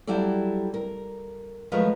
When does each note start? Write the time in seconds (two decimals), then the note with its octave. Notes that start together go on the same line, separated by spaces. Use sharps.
0.07 F#3 G3 E4 G4 A4 D5
0.74 A#4
1.72 F3 F#3 G#3 A3 A#4 B4